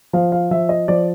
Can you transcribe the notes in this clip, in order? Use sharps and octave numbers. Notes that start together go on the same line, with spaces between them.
F3 F5
F5
F3 E5
D#5
F3 D5